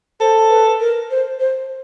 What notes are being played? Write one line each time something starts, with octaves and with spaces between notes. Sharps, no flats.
A4 C5
B4
A#4
C5
C5